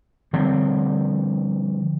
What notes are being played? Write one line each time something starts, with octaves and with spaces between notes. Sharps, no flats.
D3 F3 G3 C4